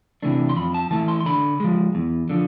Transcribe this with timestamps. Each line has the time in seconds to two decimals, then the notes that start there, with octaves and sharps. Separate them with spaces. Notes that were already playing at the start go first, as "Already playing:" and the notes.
0.22 C3 E3 A3 D4
0.49 C6
0.56 F2 B5
0.74 A5
0.91 E3 A3 E4 A5
1.08 C6
1.21 C6
1.26 D3 B5
1.60 F3 G#3
1.95 E2
2.29 D3 F3